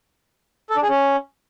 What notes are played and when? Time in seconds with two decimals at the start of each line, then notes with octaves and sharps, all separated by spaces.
0.70 A4
0.76 D4
0.83 G#4
0.89 C#4